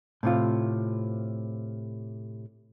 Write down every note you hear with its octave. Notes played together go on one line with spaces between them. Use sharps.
A2 C3 F4